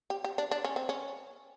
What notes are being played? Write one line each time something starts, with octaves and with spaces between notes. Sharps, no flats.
G4
G4
D4
D4
C#4
C4
C#4